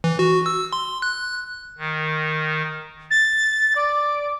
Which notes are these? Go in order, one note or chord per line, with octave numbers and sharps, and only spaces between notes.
E3
F#4
E6
C6
F#6
D#3
A6
D5